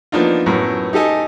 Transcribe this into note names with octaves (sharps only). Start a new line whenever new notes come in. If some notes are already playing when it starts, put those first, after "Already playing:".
F3 A#3 B3 D4 D#4 F4
F#2 A2 B3
D#4 G4 A4 D#5 G#5